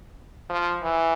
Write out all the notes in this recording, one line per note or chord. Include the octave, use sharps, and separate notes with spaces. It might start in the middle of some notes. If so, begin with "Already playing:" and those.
F3
E3